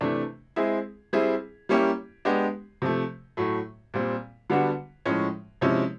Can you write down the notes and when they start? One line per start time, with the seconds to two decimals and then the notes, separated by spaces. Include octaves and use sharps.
0.01 C3 E3 A3 D4
0.56 G#3 C4 E4 G#4
1.13 G3 C4 E4 G#4
1.69 G3 A#3 C#4 E4 G4
2.25 G#3 B3 D4 G4
2.82 C3 F3 A3
3.37 A2 F#3 A3
3.94 A#2 G3 C4
4.50 D3 G3 B3 D4 F#4
5.06 A2 F3 G#3 C#4
5.61 C3 F3 G#3 C#4 E4